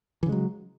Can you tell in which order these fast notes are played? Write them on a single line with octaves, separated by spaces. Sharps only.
E3 C#3 G#3 F#3